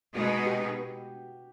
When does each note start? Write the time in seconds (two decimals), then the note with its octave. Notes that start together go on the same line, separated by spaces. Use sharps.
0.14 B2 G#3 B3 D#4 F#4 G#4
0.46 G4